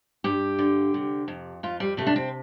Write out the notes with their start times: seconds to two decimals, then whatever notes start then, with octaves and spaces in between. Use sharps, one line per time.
0.24 G2 G4
0.59 D3
0.94 C3
1.28 F2
1.63 F2 F4
1.80 G3
1.97 C3 A3
2.07 D4
2.16 C4